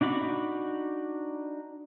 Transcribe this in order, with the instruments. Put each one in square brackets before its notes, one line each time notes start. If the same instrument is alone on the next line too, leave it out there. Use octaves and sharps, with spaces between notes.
[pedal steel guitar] D4 D#4 F#4 B5 D6